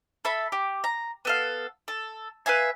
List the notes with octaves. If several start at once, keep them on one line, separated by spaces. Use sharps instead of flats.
A4 E5 B5
G4
A#5
B3 A4 F5
A4
B4 E5 F5 G#5